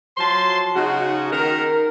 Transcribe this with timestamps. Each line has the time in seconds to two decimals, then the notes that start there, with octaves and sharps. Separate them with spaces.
0.17 F3 F#3 A5 C6
0.75 C#3 D#4 F#4
1.33 D#3 A#4